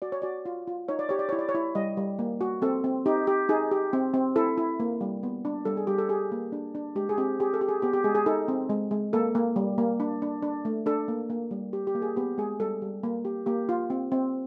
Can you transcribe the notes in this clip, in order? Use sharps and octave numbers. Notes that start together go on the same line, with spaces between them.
F#4 D5
C#5
F#4 D5
F4
F4
D#4 C#5
D5
G4 C#5
D5
E4 C#5
D5
C#5
E4
G3 D#5
G3
A#3
F#4
C4 A4
C4
D#4 G4
G4
D#4 G#4
G4
C4
C4
E4 A4
E4
A#3
G3
B3
D4
G3 A4
G#4
G3 G4
A4
G4 G#4
A#3
D4
D4
G#3 G4
G#4
C4 G4
G4 G#4
A4
G4
G#4
B3 G4
G4
G#3 G#4
G#4
D#4 A4
C4
G#3
G#3
A#3 A4
A#3
G3
A#3
D4
D4
D4
A3
D4 A4
A#3
A#3
G3
G4
G4
A#3
G#4
B3 G4
G#3 G#4
G3 A4
G3
A#3
G4
A#3 G4
F4
C4
C4